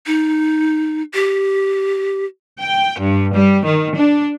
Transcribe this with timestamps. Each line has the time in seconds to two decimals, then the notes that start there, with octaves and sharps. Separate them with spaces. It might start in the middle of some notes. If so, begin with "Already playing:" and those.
0.07 D#4
1.14 G4
2.61 G5
3.00 G2
3.35 G3
3.66 D#3
3.96 D4